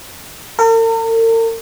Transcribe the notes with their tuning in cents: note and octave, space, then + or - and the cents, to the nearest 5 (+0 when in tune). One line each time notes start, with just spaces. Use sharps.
A#4 -45